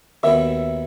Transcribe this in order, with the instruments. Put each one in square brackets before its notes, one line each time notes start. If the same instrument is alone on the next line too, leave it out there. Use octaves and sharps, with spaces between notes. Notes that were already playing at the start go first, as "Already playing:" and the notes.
[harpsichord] D#2 D#3 F#3 B3 [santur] E5